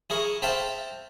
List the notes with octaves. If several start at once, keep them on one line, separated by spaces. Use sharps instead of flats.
E4 G#4 A#4 C#6
C4 A4 E5 F5 G5 A5